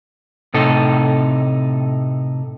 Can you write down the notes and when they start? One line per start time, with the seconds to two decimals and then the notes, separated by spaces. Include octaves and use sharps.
0.54 A2 C3 D#4 A4